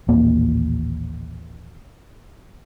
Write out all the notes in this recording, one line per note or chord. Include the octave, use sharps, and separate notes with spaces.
A1 D#2 A#2 A#3